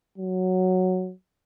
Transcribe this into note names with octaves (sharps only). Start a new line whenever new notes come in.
F#3